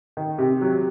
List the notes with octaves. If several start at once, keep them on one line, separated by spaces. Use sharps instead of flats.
D#3
C3
F#3